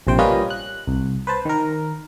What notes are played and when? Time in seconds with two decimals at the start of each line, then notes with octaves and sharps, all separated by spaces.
0.07 A#1 C3 C5 G5
0.18 G3 A#3 C#4 F4 B4 D#5
0.50 F#6
0.87 C2
1.27 B4 C5 A5
1.45 D#3 A#4